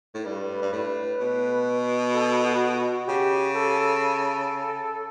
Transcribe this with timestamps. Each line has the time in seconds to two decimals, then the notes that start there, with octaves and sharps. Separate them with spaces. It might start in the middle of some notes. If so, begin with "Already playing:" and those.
0.15 A2
0.25 G2 B4
0.62 G2
0.72 A2
1.20 B2
2.14 A4
2.45 F#4
2.77 F#4
3.08 C#3 G4
3.56 A4